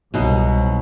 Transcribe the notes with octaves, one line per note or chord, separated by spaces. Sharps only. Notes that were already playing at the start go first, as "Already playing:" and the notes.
C2 B2 F#3 D#4